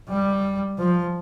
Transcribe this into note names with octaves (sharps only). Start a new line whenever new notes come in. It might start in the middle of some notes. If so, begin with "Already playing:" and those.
G3
F3